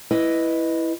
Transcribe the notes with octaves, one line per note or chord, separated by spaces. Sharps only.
E4 B4 D#5